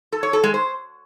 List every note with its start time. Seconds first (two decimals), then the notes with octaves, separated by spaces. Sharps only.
0.12 A4
0.23 C#5
0.33 A4
0.44 G#3
0.54 C5